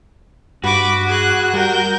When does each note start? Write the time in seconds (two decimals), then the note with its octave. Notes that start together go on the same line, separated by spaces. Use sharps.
0.64 G2 F#4 B4 D6
1.07 G#4 F#6
1.54 G3 A#4 G6